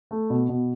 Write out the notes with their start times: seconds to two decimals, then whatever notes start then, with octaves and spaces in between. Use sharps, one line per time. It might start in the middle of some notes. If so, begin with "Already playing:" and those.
0.11 A3
0.30 B2
0.49 B2